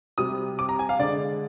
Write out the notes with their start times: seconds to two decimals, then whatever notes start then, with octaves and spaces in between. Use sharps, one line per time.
0.18 C3 G3 D#6
0.59 D6
0.69 A#5
0.79 G#5
0.89 F5
0.99 D3 G#3 D5